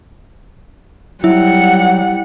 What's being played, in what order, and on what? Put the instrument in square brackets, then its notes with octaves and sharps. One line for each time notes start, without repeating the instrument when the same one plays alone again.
[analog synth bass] F#3 [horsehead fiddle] G3 F#5 [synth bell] E4